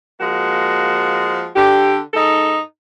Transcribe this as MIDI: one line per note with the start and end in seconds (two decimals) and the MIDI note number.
0.21 1.50 53
0.21 1.50 56
0.21 1.50 58
0.21 1.50 66
1.56 1.99 50
1.56 1.99 67
2.14 2.59 44
2.14 2.59 63
2.14 2.59 69